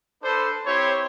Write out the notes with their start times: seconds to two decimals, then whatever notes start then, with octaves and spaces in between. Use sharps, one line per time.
0.22 D4 A4 B4 C5
0.66 C4 E4 G4 C5 C#5